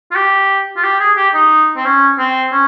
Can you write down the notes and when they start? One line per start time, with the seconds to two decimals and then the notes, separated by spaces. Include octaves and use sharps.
0.11 F4
0.15 G4
0.77 F4
0.83 G4
1.00 G#4
1.17 G4
1.34 D#4
1.76 C4
1.85 C#4
2.19 C4
2.52 C#4